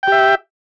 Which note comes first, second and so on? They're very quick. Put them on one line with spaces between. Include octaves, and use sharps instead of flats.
G5 G4 E5